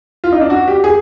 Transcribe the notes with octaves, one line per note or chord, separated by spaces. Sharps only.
F4
D#4
D4
F#4
G4
G#4